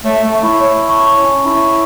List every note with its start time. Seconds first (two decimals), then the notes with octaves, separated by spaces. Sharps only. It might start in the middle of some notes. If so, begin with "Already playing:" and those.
0.05 A3 C#5
0.24 A3
0.33 A5 C#6
0.43 E4
0.60 C#5
0.89 A5 C#6
1.17 C#4 C#5
1.45 E4 A5 C#6